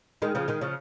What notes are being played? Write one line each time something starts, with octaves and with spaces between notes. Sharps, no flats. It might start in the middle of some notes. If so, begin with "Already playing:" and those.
D#3 G#3
C#3 F3
D#3 G#3
C#3 F3